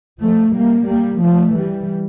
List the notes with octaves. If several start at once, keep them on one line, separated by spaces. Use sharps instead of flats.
F3 A3
G3 A#3
G3 A#3
F3 A3
E3 G3